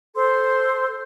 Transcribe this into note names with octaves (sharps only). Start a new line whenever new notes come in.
A4 C5 C6